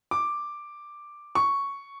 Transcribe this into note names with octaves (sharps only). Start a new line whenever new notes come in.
D6
C#6